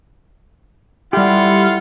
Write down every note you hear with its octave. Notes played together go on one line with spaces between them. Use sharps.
G3 A3 E4 F4 G4 F#5